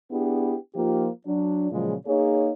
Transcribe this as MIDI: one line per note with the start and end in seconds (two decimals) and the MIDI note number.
0.11 0.55 59
0.11 0.55 62
0.11 0.55 64
0.11 0.55 67
0.11 0.55 68
0.75 1.08 53
0.75 1.08 58
0.75 1.08 63
0.75 1.08 65
0.75 1.08 67
1.26 1.69 54
1.26 1.69 62
1.72 1.95 46
1.72 1.95 49
1.72 1.95 53
1.72 1.95 54
1.72 1.95 56
2.07 2.50 58
2.07 2.50 63
2.07 2.50 68
2.07 2.50 73